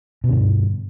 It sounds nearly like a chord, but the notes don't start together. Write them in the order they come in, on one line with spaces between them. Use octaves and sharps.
B2 D3 G2